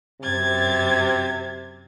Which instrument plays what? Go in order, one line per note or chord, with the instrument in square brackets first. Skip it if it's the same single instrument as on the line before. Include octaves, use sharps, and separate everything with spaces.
[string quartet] F#2 G#6 A6 [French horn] C3